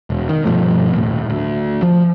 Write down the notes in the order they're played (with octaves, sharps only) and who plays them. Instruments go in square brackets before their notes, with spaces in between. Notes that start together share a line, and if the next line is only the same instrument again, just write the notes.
[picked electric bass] E1
D#3
G2 B2 F3 A3
D#1 A2
D2
F3